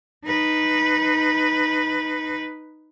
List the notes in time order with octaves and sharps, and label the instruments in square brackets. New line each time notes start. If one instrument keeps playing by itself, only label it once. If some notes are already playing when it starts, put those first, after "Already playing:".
[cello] D#4 B4